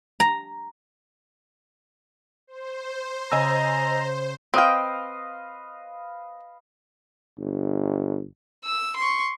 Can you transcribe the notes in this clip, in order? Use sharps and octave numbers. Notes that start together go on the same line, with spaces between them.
A#5
C5
C#3 D#5 G#5 A#5 E6
C4 B4 D#5 F5 G5
G1
E6
C6 C#6